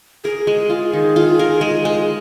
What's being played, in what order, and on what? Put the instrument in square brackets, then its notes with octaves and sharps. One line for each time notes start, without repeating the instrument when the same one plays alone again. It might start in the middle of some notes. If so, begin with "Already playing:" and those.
[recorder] G#4 [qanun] A#4
[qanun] G#3
F4
D#3
F4
A#4
G#3
G#3